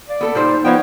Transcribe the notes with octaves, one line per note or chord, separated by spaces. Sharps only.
D5 F5
A#3 B3 A4
A#2 G3 D#4 C5
F3 B3 C#5 D5 G5